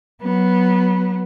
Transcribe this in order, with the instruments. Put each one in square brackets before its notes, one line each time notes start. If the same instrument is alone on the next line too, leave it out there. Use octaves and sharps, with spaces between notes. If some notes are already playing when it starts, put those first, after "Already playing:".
[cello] F#3 B3